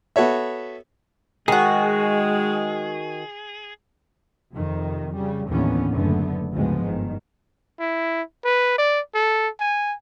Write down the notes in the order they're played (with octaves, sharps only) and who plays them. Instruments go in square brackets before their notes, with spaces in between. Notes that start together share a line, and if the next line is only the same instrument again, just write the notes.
[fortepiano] B3 F#4 A4 C#5 E5
[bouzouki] D#3 F#4 [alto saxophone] G#3 [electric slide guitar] G#4
[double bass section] F2 C3 D#3
C#3 G3
D#2 A2 D3 E3 B3 C#4
F#1 F#2 D3 A3 B3
D2 G#2 C#3 F3 G#3 B3
G1 D#3
[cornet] E4
B4
D5
A4
G#5